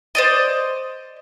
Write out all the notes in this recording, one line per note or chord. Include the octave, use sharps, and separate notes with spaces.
C5 D5 D#5